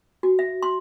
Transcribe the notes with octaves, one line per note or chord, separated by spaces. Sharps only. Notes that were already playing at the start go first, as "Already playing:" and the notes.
F#4
E5
C6